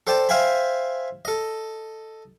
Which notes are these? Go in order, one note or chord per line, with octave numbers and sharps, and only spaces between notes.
A4 C5 D5 G5 A5
C5 E5 F5 G5 G#5 B5
A4 D#5